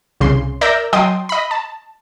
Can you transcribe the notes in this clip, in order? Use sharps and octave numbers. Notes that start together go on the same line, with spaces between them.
C2 C#3 C6
A#4 D5 E5 E6 G6 A#6
F#3 D#5 G5 A5 C6 D#6
D#5 B5
A5